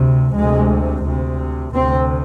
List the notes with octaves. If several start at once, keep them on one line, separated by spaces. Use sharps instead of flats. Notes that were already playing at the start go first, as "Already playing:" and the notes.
Already playing: D2 C3
D2 C3 G#3
D2 C3
D2 C3 C4